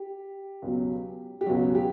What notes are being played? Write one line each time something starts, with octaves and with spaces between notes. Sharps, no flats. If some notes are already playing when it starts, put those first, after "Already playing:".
Already playing: G4
C#2 B2 F#3
G4
C#2 B2 F#3 F#4
G4